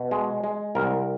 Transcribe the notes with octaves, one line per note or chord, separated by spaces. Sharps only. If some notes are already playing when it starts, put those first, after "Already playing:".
Already playing: B2
G#3
G#3
C2 A#4